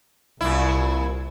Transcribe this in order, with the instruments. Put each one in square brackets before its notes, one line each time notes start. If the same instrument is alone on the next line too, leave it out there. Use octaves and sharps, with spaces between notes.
[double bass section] C2 [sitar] A#2 E4